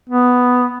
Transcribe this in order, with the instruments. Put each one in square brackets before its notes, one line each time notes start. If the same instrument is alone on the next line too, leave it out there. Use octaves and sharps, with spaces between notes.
[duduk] B3